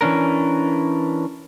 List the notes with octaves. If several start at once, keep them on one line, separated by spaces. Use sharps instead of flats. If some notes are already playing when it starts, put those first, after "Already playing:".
E3 C#4 D4 A#4